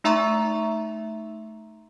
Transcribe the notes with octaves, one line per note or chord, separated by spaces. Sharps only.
A3 D#4 E5 A#5 C6 C#6